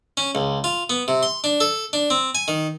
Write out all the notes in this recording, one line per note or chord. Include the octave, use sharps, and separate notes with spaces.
C#4
C#2
F4
B3
C3
C6
D4
A4
D4
C4
G#5
D#3